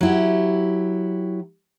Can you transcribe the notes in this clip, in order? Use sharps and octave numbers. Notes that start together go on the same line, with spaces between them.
F#3 E4 G4